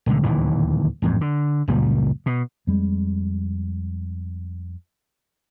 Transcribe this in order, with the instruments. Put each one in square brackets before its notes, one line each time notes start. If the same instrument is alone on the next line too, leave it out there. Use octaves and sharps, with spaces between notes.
[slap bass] D#1 C#2 D3
D1 D#2 A#2 E3
A1 F2 G#2
D3
F#1 C#2 A#2 G3
B2
[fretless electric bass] F2 G3 G#3